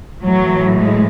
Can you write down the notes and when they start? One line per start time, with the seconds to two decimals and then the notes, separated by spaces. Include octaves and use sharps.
0.23 A2 E3 F#3
0.75 G#3